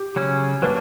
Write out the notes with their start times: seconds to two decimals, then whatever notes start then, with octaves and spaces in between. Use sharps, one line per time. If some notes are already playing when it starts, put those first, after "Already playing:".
Already playing: G4
0.16 C#3 F#3 C#4
0.62 F#3 A#3 D4 B4